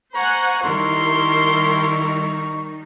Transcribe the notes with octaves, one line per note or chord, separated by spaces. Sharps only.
C5 F#5 G#5 A#5 C#6
D#3 G3 D#4 E4 A#4 C6